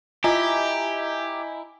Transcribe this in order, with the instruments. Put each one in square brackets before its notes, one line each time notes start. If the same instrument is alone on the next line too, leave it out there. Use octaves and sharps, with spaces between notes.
[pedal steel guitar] E4 [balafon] F4 [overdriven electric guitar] G4 [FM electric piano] D#5 G#5 A#5